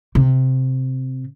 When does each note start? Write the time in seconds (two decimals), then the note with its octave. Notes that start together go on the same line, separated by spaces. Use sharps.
0.15 C3